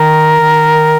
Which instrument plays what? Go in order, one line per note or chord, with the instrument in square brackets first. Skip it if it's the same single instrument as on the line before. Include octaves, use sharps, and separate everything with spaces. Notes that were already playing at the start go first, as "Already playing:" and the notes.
Already playing: [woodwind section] D#3 A#4
D#3